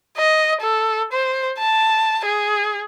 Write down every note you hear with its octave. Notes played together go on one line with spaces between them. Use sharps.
D#5
A4
C5
A5
G#4